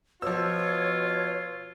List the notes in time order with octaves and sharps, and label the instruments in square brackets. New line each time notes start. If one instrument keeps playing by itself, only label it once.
[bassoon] B2 [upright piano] F3 E6 [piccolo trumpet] F4 [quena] C#5